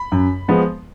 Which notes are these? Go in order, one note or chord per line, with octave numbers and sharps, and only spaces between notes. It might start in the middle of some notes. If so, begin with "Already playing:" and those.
Already playing: B5
F#2
F3 G#3 B3